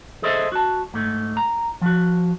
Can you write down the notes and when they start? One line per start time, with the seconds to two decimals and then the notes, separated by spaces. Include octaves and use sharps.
0.23 G#4 A4 C5 D#5 E5
0.52 F#4 A5
0.94 G#2 A3
1.37 A#5
1.81 F3 F#4